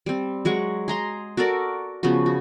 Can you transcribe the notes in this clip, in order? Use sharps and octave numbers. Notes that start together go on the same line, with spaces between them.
G3 C4
F#3 G#3 F#5 C#6
G#4 A#5 C6
F#4 A4 A#4 D5
C#3 F3 B3 F#4
F#4